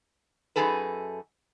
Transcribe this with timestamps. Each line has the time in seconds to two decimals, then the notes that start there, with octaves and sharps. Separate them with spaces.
0.56 F#2 D3 D#4 G#4 A4 B4